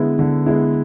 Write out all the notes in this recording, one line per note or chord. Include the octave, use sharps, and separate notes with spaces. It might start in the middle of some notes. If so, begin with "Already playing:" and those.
Already playing: D3 G#3 B3 E4
D3
G#3 B3 E4